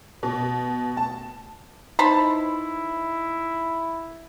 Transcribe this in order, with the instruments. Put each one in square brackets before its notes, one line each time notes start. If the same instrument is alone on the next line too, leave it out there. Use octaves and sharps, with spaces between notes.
[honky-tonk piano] B2
A5
[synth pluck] D#4 B4 [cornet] E4 [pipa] C5 A5 B5